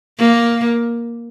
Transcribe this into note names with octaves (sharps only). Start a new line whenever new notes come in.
A#3